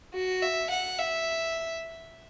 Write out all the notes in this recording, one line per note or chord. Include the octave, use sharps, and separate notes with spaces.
F#4
E5
F#5
E5